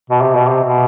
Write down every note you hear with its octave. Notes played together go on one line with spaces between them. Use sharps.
B2
C3
B2
C3
B2